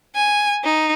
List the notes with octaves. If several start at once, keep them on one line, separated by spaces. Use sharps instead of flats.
G#5
D#4